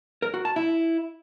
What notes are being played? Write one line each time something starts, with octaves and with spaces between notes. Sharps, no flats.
A#4
F#4
A5
E4